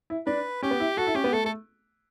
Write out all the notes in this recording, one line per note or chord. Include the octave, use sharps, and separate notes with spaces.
E4
D4 B4
C#4 G4
B3
E4
F#4 A4
E4
C#4 G4
B3
A3 A4
A3 A4